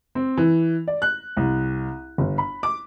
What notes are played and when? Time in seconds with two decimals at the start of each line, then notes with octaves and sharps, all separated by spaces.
0.15 C4
0.37 E3
0.87 D5
1.02 F#6
1.37 C2
2.18 G1
2.38 B5
2.63 D6